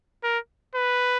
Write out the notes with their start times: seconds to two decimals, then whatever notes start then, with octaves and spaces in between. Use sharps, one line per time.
0.24 A#4
0.75 B4